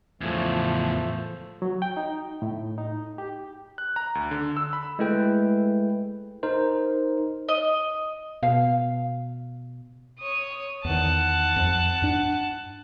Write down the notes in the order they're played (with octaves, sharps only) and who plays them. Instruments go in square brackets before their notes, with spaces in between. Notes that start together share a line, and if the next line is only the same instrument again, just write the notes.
[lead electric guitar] E2 A2 [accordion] F3 A3
[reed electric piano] F#3
G5
D#4
A2
D#4
G4
[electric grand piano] F#6
A#5
D2
D3
E6
B5
[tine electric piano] G#3 A3 E4 B4 G5
D#4 A#4 C5
[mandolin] D#5
[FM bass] B2 [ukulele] F5
[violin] C#5 D#6
[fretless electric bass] E2 D#3 [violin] F#5 A5
[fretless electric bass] F2
G2 D4